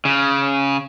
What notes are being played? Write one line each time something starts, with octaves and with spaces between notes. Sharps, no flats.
C#3